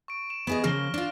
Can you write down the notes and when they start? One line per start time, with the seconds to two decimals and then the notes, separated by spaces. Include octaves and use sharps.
0.08 C#6 D7
0.30 E7
0.47 B3 G#4 D#5
0.64 C#3 F3 A#3 F6 A#6 G7
0.94 D4 F4